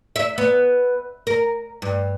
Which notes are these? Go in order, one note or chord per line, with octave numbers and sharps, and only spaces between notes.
E5
B3
A#4
G2